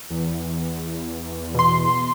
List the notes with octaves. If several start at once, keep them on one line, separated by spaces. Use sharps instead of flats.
E2
B2 C6